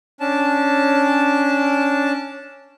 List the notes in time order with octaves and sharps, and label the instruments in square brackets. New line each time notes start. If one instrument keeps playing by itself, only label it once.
[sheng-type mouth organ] C#4 D4 A5